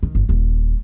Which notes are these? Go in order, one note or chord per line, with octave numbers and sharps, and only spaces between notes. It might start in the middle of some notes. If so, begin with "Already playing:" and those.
D#3
G1
D#1